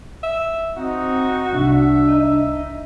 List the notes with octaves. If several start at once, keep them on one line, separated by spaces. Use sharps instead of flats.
E5
C4 D#4 F#4
C2 D4 E5
D#4